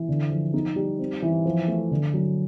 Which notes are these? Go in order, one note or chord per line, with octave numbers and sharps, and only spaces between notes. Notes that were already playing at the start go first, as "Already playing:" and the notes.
Already playing: E3
D3
F3
D#4
G3
C4
E3
F3
A3
D3
F#3